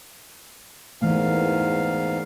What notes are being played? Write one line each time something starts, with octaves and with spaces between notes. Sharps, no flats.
E2 G#2 E3 A3 A#3 F5